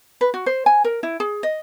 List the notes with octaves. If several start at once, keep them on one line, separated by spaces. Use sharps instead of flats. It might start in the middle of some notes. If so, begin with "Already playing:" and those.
B4
F#4
C5
G#5
A#4
E4
G#4
D#5